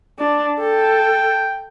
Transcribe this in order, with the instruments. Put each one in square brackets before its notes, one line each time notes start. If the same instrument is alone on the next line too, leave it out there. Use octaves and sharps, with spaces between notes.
[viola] D4
[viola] A4 [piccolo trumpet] G5